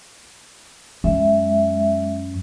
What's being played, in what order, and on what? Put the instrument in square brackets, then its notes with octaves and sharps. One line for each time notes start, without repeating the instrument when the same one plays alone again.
[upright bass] F#2 [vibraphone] G#3 E5